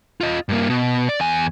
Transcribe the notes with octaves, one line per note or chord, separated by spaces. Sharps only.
F4 D#5
G2 A#3
B2
D5
E2 G#5